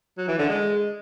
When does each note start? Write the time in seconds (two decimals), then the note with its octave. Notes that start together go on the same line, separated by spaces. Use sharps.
0.18 F#3
0.28 E3
0.38 D3
0.49 G#3